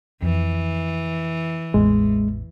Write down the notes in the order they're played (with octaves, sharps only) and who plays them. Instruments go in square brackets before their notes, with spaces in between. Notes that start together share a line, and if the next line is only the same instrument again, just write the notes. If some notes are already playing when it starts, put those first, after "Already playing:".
[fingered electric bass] F2 [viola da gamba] E3
[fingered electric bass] A1 E2 [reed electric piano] G#3